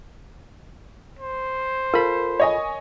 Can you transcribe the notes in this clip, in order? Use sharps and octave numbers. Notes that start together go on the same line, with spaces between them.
C5
F4 A4 A#4 B5
C#5 D#5 G#5